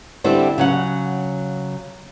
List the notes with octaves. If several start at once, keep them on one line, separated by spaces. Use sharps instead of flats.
D3 G3 C4 E4
C#3 F#3 F#5